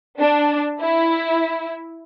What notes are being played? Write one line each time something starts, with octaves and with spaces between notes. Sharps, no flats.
D4
E4